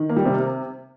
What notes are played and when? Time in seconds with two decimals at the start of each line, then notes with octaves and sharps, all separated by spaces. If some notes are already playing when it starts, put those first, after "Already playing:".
Already playing: D#3
0.09 A#3
0.16 G3
0.25 C3